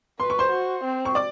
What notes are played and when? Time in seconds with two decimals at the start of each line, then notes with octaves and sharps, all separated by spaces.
0.20 B4 C6
0.30 C#6
0.39 C5 C6
0.51 F#4
0.84 C4
1.05 C#6
1.15 D5 D6